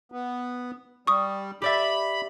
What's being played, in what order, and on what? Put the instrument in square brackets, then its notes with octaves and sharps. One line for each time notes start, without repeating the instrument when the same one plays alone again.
[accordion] B3
[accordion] G3 [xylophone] C#6 D#6
[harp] G4 D5 E5 [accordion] B5